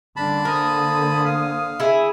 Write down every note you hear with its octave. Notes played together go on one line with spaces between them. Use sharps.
D3 G3 A#3 C#4 D4 A5 B5
A#4 C5 G#5 D#6
F5
E4 G#4